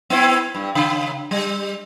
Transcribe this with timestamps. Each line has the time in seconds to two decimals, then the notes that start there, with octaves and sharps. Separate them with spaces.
0.10 B3 C4 E4
0.55 G2
0.75 C#3
1.31 G3